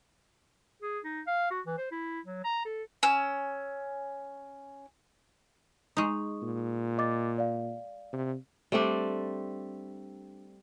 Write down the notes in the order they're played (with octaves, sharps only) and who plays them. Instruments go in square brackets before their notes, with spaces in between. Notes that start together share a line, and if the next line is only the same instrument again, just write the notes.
[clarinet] G#4
D#4
F5
F#4
E3
C5
E4
F#3
A#5
A4
[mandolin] C#4 E6
[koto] G#3 D#4 [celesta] C#6 D#6
[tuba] A#2
[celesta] D#5 D6 A6
D5 F5
[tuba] C3
[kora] G3 A3 C4 D4